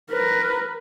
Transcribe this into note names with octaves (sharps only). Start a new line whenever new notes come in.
A#4 B4